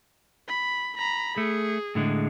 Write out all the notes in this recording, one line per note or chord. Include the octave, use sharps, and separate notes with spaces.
B5
A#5 B5
A3 G#4
A2 D3 G#3